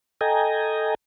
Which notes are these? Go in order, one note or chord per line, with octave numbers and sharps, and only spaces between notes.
A4 D#5 G5 G#5 A#5